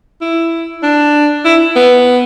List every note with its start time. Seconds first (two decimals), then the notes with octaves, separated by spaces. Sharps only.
0.21 E4
0.83 D4
1.45 E4
1.76 B3